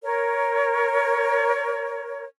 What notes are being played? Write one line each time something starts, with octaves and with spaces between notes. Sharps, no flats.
A#4 C#5